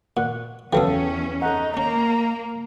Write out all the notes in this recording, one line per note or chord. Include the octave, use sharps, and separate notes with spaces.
A#2 F#5
E2 E3 F#3 B3 C#4 A4 F5 G5
D#4 A4 F#5
A#3 C#4 A#5